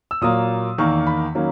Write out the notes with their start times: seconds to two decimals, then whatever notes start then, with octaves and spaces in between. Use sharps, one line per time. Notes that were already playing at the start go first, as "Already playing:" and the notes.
0.11 E6
0.21 A#2 F#3 A#3 D#6
0.78 E2 D#3 A#3 C#6
1.07 B5
1.35 D#3 F#3 A#3 C#4